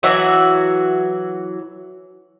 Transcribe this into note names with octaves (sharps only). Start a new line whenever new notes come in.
E3 F#3 F#4 E5